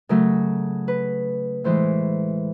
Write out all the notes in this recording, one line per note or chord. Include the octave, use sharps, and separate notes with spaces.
C#3 F#3 A3 A#4
B4
A2 E3 G#3 C5